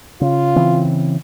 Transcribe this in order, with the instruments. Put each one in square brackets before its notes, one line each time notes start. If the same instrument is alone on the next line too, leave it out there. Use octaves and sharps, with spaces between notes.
[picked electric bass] C#3 [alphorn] F4
[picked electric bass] C#3 E3 C4